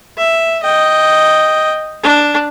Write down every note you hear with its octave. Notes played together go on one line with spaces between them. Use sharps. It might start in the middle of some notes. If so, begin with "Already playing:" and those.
E5
D#5 G5
D4